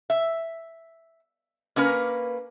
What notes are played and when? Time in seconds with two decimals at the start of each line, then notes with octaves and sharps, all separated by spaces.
0.10 E5
1.76 A#3 C#4 A#4 B4